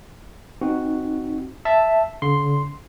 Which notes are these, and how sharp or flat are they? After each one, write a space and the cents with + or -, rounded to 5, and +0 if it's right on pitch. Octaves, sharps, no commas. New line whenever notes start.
C4 +5 D#4 +0 F#4 +0
E5 +0 A5 +0
D3 -45 C6 +0